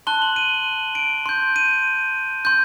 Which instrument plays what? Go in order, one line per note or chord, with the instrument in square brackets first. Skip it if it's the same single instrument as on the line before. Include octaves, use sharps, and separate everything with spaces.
[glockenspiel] A5 C6 F#6 G7
F#7
D#7
D7
C6 G6
D#7
C6 G6